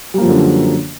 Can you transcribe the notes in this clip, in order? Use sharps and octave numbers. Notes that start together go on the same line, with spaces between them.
F#2 D3 F3 G3 A#3